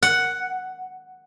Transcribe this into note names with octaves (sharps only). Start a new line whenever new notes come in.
F#5